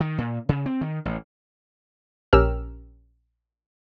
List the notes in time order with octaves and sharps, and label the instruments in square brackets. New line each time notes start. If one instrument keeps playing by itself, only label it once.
[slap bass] D#3
A#2
C#3
C4
D#3
A1
[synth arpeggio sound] A#1 C#4 G4 A#4 E6 F6